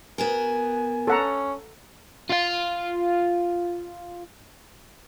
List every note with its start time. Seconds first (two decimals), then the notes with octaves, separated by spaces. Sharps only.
0.18 B3 F#4 A#4 G#5
1.07 C#4 A4 F#5 A#5
2.29 F4 F5